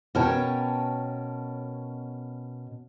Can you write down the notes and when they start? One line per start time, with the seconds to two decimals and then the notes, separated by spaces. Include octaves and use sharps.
0.15 B2 C#4 A#4 C#5 G5 A5